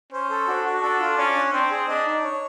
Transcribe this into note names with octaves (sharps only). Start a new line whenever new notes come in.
C#4 C5
A4
D4 F#4
F#4
D4 A4
F4
C#4 D5
D4
C4 C5
G#4
D4 D#5
D#4
C#5